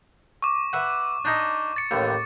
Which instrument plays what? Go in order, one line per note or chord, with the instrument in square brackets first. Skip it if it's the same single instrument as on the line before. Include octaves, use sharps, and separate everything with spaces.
[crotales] C#6 D6
[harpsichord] B4 E5 F#5
D4 D#4 D#5
[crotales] A6 C#7
[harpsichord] A1 D#2